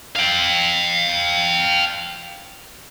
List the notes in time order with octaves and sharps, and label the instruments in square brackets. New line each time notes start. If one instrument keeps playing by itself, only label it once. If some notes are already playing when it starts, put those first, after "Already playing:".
[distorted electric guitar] F5 G5